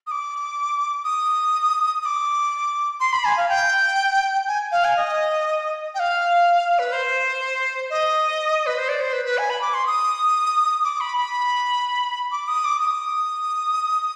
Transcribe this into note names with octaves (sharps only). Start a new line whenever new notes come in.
D#6
D6
D#6
D#6
D6
C6
B5
G#5
F5
G5
G#5
F5
G#5
D#5
G5
F5
B4
C5
D#5
B4
C5
D5
C5
B4
B4
G#5
B5
D6
C6
D#6
D6
B5
B5
D6
D#6
D6
D#6